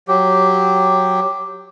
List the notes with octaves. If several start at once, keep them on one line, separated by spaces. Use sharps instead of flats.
F#3 G4